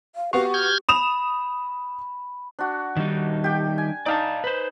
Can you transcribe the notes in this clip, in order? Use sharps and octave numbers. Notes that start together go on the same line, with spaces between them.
F5
B3 F#4 G4 F5 C#6
F6 G6 G#6
B5 D#6 E7 F7
D4 F#4
D#3 G3 D#4
G4 G5
G#5
D#4 D5 F5 A5
B4 C5